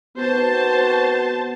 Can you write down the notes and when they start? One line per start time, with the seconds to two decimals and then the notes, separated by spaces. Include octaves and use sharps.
0.17 D#3 B3 C4 F#4 C5 A5